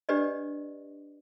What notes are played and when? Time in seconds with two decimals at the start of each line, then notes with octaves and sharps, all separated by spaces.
0.09 D4 G4 B4 D5 D#5